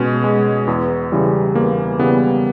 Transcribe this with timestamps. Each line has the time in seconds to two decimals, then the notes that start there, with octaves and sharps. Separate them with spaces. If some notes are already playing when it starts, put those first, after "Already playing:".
Already playing: B2 G#3 C#4
0.24 G#3
0.67 E2
1.12 C#3 E3 G3
1.55 E2 A#3
1.99 C#3 E3 G3 B3